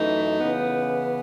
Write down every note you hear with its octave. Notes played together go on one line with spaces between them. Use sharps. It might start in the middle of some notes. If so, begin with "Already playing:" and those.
Already playing: F#2 E3 A3 D#4
C#3 E3 B3